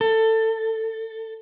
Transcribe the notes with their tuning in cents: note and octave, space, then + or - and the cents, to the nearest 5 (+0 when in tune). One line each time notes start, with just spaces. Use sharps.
A4 +20